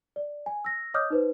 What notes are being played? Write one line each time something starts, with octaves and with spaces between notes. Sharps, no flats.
D5
G#5
E6 A#6
C#5 D#5 D6 D#6 F6 G6
D#4 B4 C5